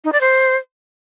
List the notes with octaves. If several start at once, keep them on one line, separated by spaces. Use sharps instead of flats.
D#4
D5
C5